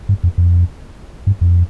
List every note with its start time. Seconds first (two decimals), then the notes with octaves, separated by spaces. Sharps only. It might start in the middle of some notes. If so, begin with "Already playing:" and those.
0.09 G2
0.24 F2
0.38 F2
1.27 G2
1.41 F2